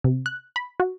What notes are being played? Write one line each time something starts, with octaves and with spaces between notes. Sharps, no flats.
C3
F#6
B5
F#4